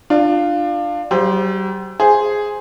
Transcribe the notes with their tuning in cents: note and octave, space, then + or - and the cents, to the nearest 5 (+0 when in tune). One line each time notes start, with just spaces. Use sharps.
D4 +25 F4 +0
G3 -45 G4 +40 C5 +0
G#4 +0 C5 +0